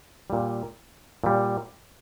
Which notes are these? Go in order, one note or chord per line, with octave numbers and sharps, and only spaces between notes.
A#2 G3
A#2 G3